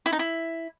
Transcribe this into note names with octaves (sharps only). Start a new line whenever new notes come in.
E4
D#4
E4